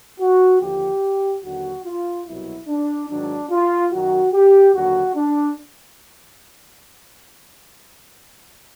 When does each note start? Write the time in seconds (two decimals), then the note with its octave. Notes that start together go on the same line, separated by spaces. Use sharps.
0.19 F#4
0.61 D#2 D3 F3 G4
1.43 D#2 D3 F#3 F#4
1.85 F4
2.26 C2 B2 F#3 E4
2.67 D4
3.09 G#2 D#3 F#3 D4
3.50 F4
3.92 F#2 D#3 F#3 F#4
4.33 G4
4.74 D#2 D3 F#3 F#4
5.15 D4